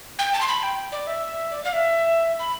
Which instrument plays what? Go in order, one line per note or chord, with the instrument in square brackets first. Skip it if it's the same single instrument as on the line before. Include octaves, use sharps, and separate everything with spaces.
[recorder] G5
A5
C6
B5
G5
D5
E5
D5
F5
E5
B5